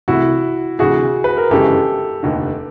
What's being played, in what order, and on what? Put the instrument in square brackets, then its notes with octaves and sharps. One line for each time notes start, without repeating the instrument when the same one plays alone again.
[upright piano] C2 C3 E3 A3 [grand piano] E4 F#4
[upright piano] D2 C3 E3 [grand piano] F#4 G#4
[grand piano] B4
A#4
[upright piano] G1 F#2 C#3 E3 G#3 [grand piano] G4 A4
[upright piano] F1 D#2 D3